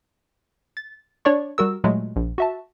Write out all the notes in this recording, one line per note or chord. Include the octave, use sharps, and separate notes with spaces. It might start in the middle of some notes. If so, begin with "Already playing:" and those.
A6
D4 C#5 D5 C#6
G3 F#4 A#4 E6
A#2 F#3 G#3 A3
A#1
F#4 E5 A5